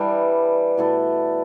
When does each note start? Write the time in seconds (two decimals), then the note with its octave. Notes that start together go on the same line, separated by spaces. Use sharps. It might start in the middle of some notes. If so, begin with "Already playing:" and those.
Already playing: E3 G3 D4
0.77 B2 A3 E4 A4